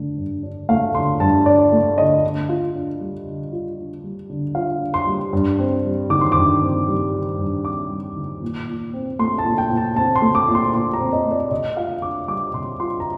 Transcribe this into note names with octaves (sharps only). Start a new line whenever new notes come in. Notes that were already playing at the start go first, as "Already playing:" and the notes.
Already playing: G2 D3 A3
G2
D4
A3 F5
D3 C6
G2 A5
D4 D5
A3
D3 D#5
D3
F4
D4
G3
D3
F4
D4
G3
D3
F4 F5
D4
C6
G3
G2
C4
G3
D#3 D6
C6
G2 D6
C4
G3
D#3
G2
C4 D6
G3
D#3
A#2
A#2
C4
A3 C6
A5
A#2
G5
A#2
A5
C4 A5
C6
A3
D6
A#2
C6
A#2 C6
A#5
C4
D#5
A3
D5
C3 D#5
F4 F5
D4 D6
G3 D6
C3 C6
F4 C6
A#5